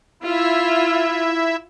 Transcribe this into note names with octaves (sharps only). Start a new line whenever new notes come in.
E4 F4 E5